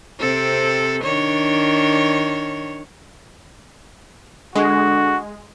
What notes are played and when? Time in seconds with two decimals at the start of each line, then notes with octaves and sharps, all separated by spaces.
0.20 C3 C4 A4
1.03 D#3 D4 C#5
4.55 D3 G#3 F#4